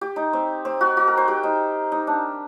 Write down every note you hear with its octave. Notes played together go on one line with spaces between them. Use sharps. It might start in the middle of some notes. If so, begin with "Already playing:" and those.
G4
D#4
C4
C4
F#4
F#4
A#4
C5
G4
D#4
D#4
D4